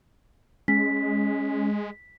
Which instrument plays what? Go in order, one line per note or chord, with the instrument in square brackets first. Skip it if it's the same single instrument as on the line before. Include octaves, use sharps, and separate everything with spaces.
[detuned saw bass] G#3 [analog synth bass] C#4 [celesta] B6